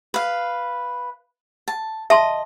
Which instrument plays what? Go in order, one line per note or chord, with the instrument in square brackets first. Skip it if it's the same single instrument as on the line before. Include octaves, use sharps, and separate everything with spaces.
[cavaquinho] B4 F5
A5
[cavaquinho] D#5 [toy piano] E5 A5 C6